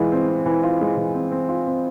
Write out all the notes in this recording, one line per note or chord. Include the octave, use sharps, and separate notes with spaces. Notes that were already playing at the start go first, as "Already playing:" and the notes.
Already playing: E3 G#3 F4
C4
C4
E3
F4
G#3
E3
C4
C4
F4
C4